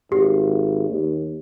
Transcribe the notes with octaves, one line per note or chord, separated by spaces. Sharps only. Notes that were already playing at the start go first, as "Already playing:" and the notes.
G#1 G4
D#2